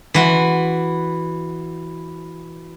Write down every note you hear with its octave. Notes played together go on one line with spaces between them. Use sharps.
E3 F#4 C6